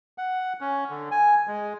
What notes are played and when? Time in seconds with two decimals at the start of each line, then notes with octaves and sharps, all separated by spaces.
0.18 F#5
0.61 C#4
0.90 D3
1.11 G#5
1.47 G#3